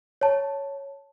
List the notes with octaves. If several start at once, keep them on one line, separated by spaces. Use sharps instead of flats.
C#5 A5